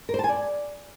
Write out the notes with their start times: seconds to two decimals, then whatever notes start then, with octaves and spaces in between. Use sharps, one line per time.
0.09 A#4
0.14 C5
0.19 A5
0.24 G#5
0.29 D5